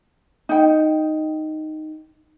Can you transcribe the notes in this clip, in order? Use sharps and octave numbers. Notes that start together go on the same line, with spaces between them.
D#4 G5